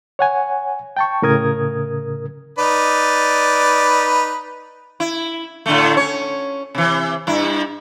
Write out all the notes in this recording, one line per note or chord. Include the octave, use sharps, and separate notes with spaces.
C#5 F#5 G#5
G5 A5 C#6
A2 C#3 A#4 D#6 G#6
D#4 B4 D5
E4
A2 D3 A3
C#4 C#5
C3 E3
G2 E4